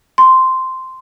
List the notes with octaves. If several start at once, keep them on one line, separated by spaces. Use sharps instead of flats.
C6